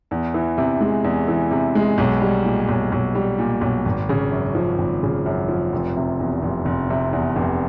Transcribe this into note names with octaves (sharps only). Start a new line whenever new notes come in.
E2
E3
C3
G#3
E2
E3
C3
G#3
B1
G3
A#2
B1
B1
G3
A#2
B1
G#1
C#3
F#2
F3
G#1
C#3
F#2
F3
F1
C3
E2
F1
F1
C3
E2
F1